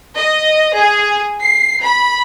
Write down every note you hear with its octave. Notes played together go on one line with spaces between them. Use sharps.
D#5
G#4
C7
B5